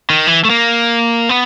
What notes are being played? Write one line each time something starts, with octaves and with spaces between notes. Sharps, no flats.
D#3
E3
A3
A#3
B3